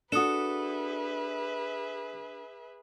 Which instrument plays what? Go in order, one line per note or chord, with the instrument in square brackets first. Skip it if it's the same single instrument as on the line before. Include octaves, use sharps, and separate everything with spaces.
[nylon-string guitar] D4 F#4 [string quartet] G#4 B4 E5 [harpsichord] A4 [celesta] D#6 E7